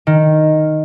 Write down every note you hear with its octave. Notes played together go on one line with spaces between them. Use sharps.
D#3